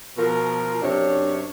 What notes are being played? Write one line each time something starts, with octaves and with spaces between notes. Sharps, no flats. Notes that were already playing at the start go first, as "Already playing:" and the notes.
B2 F3 A#4
F#2 C3 D4 C#5